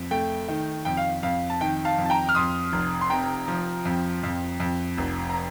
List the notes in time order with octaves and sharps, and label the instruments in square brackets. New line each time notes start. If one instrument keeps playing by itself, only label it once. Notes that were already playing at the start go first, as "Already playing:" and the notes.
Already playing: [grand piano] F2
A3 G5
D#3
F2 G5
F5
F2 F5
A5
D#3 G5
F5 A5
F2
A5
G5 A#5
F6
F2 C6 D#6
F1
C6
C3 G5 A#5
F3
F2
F2
F2
F1
A#5